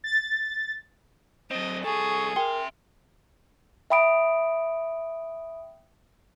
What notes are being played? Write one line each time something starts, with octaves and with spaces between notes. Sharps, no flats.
A6
F#3 C4 D#5
C2 G#4 A4 C#6
A#4 E5 G5 C6
E5 G5 B5 D#6 D7